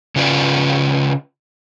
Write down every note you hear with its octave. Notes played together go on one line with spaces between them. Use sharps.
C#3 C#4 F4 B4 D5